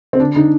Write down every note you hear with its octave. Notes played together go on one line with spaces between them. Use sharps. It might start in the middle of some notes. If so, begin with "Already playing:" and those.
C4
D3 D4
D3 D#4